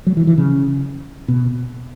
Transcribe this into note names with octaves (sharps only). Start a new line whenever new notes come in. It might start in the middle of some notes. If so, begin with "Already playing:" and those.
F#3
E3
E3
C#3
B2